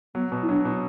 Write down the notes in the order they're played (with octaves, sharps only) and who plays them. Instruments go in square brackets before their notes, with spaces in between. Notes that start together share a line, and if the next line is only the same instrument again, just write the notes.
[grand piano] F#3 [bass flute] B3
[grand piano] B2
[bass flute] E4
[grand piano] F#3 [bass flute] D4
[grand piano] B2